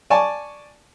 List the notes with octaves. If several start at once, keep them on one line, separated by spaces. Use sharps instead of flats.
D5 G#5 A5 C#6